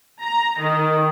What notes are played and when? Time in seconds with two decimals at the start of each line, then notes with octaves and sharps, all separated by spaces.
0.21 A#5
0.59 D#3